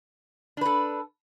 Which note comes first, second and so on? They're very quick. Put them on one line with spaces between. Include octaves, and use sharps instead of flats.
D4 B4 A4